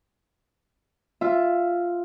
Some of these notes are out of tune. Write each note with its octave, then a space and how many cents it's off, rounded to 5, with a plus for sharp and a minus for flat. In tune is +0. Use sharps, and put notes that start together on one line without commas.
F4 +0 E5 +10